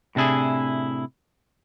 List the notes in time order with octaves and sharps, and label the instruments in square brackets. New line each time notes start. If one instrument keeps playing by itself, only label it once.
[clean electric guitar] A2 C3 D4 E4 G#4